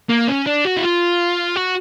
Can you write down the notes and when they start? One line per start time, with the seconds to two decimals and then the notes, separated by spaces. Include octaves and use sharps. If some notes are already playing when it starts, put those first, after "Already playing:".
0.10 A#3
0.28 C#4
0.46 D4
0.65 F#4
0.77 E4
0.83 F4
1.56 F#4